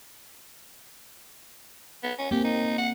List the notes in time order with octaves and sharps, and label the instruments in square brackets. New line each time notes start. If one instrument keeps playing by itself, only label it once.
[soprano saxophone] B3
C#4
[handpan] A#3 C4 [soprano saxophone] G4
[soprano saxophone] D#4
F#5